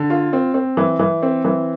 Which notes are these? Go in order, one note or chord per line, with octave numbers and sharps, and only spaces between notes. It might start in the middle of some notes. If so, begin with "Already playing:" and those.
Already playing: D3
F4
C4
C4
E3
E3
C4
E3